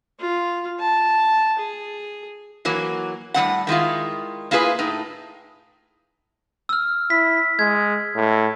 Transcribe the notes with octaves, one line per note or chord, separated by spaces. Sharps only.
F4
A5
G#4
E3 F#3 A#3
A2 G3 C4 F#5
D#3 G#3 E4 F4
A#3 E4 F4 G#4 B4 G#5
A2 D#4
E6 F6
E4 B6
G#3 G#6
A2